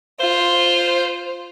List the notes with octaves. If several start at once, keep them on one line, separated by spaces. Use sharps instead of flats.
F4 C5